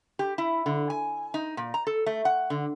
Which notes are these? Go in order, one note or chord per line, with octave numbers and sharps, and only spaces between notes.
G4
E4
D3
G#5
D#4
A#2
A#5
A4
A3
F#5
D3